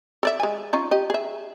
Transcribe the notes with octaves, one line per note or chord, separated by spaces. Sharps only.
A4 D5 E5
G#3 G#5
C#4 D#4 F4
G4 D#5
G#4 E5